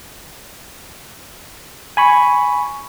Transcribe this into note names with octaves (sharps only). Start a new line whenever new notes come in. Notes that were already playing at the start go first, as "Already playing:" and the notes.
G#5 B5 C#6